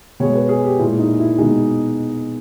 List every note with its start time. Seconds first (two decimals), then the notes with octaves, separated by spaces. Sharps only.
0.20 B2 G#3 C#5
0.34 B4
0.49 G#4
0.64 G4
0.79 A#2 G#3 E4
0.99 D#4
1.19 E4
1.38 B2 G#3 D#4